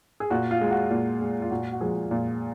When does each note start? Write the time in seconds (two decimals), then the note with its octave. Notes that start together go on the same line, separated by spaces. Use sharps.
0.20 G#4
0.30 A#2 F#4
0.51 F4
0.61 G#3
0.71 F#4
0.91 A#2
1.21 G#3
1.42 F4
1.51 A#2 F#4
1.72 F#4
1.81 F3 G#3 G#4
2.11 A#2